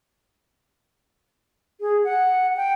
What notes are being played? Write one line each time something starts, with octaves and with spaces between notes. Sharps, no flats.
G#4
F#5
G5